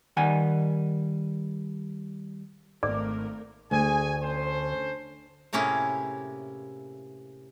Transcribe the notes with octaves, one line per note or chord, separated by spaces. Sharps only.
D#3 G3 F#5 G#5
G#1 A3 A#3 A#4 D5 D6
D2 G#4 G#5
C#4 A4 C5
A2 C3 A#3 C#4 E4 G#4